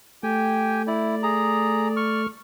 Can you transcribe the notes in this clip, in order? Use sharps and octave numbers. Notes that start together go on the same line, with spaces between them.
A3 G4 G5 G#5
E4 D5
G#4 A#5
C#6 F6